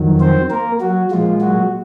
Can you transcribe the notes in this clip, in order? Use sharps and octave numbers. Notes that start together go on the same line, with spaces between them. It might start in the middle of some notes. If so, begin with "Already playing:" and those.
Already playing: F2 D#3 F#3
C4 C5
A#3 A#4
F#3 F#4
A#2 F3 G#3 F4
F#3 F#4